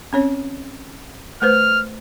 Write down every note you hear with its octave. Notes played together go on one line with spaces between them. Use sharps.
C4 C#4 C#5
A3 B4 C5 F6